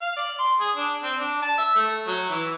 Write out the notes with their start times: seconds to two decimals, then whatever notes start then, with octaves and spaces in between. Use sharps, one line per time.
0.02 F5
0.17 D5
0.38 C6
0.60 G#4
0.76 D4
1.04 C4
1.19 D4
1.42 A5
1.58 E5
1.75 A3
2.07 F#3
2.30 E3